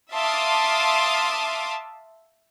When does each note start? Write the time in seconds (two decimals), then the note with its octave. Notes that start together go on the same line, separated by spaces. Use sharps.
0.12 E5 F5 A5 C6 D6 D#6